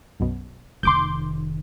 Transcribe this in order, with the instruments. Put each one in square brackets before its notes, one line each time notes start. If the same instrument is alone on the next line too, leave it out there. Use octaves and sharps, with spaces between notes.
[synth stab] B1 F#2 B2
[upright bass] F1 D#3 [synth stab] C6 D6 G6